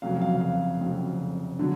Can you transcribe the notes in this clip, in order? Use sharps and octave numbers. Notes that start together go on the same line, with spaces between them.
F1 F2 C#3 F#3 F5
F5
F5
F1 F2 C#3 F#3
D3 F#3